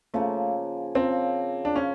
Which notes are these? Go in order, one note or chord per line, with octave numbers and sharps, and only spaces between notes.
C#3 F3 A3 A#3
C#3 F3 A#3 C4
D4
C#3 F3 C#4